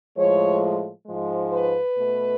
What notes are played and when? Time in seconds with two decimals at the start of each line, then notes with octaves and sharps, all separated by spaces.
0.17 A2 F3 G#3 C#5
1.07 G#2 F3 G#3
1.52 B4
1.97 B2 A3